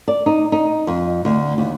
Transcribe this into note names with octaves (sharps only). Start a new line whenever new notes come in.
D5
D#4
D#4
F2
D2
D#2